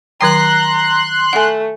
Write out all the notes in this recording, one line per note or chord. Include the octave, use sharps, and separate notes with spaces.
D#3 F#3 G5 A#5 C6 F#6
A3 F#5 G#5